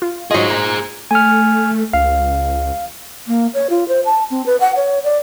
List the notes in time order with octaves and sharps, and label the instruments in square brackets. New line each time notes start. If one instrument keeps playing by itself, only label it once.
[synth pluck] F4
[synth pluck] G#2 F4 [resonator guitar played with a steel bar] F#3 D#5 [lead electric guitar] G#4 C5
[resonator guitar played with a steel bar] A#2 [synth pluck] A#5
[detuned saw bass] A3 [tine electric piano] G#5 F6
[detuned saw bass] C#2 [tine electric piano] F5
[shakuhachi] A#3
C#5
F4
C5
A5
C4
B4
F#5
C#5
D5